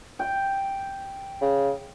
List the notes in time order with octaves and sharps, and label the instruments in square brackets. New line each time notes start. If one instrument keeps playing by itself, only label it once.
[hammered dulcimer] G5
[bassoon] C#3